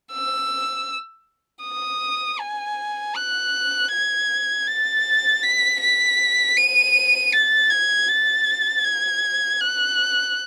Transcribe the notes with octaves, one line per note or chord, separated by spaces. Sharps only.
E6
D#6
G#5
F#6
G#6
A6
B6
B6
D#7
A6
G#6
A6
G#6
F#6